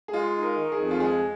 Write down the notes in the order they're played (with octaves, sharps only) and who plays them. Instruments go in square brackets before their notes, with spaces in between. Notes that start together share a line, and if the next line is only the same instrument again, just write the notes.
[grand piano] G#4
[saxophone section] G#3 [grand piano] F4
[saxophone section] D#4
[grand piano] A#4
[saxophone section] D#3
[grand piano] G#4
[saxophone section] F2
[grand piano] F4
[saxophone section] G#3 [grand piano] G#4